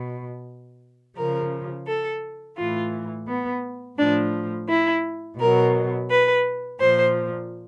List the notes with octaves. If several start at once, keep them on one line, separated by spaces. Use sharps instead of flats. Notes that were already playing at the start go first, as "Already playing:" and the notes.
Already playing: B2
C#3 F3 A#4
A4
A2 E3 F4
B3
A2 F3 D4
E4
B2 F#3 A#4
B4
A#2 F3 C5